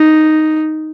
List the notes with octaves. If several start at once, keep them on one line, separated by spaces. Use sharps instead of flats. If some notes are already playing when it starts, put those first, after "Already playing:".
Already playing: D#4